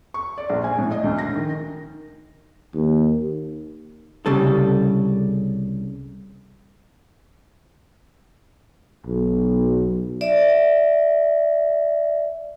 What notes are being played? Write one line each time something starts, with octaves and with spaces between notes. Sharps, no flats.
C#6
D5
A#1
G#5
A2
D#5
D2
A#6
D#3
D#2
C2 C#3 G3 A4
B1
D5 E5